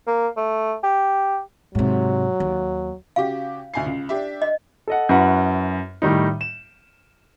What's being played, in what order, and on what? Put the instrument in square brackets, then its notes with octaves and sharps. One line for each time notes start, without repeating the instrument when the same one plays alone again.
[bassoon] A#3
A3
G4
[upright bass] G#2 C3 [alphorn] F#3
[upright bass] D#2
[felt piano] C#3 F#4 G4 [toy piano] F5
[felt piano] D2 G#5 C7
C#2
D4 G4 E5
[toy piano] D#5
[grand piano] A4 D#5 F#5
F#2 E4 F#4 B4 F#5
A2 D#3 G3 D#4
E7